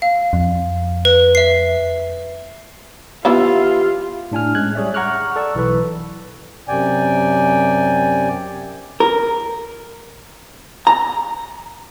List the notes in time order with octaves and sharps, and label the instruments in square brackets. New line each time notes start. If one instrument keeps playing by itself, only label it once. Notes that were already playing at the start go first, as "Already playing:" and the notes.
[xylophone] F5
[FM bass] F2
[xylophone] B4
E5 C7
[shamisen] E3 B3 E4 [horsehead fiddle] F4 [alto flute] G4
[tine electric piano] A2 D4 G#5 F6
G#3 C#4 F#6 G#6
G3 G#4 C#5 D5 E5
F#5 A#5 C#6 D6 F6 F#6
A4 D5 C#6 E6
B1 E3 A4 B4
[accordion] F#2 C3 D5 G5 G#5
[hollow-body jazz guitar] A#4
A#5